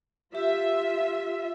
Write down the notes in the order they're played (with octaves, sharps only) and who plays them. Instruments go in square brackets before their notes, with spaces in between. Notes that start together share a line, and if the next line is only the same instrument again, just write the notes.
[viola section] F4 E5 [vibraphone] G4